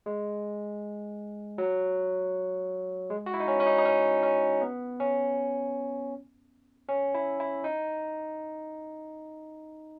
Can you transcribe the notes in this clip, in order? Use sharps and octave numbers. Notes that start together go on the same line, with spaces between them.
G#3
F#3
G#3
F#4
E4
D#4
C#4
C#4
D#4
D#4
C#4
C#4
B3
C#4
C#4
E4
E4
D#4